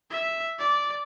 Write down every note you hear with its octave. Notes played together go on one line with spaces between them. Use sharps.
E5
D5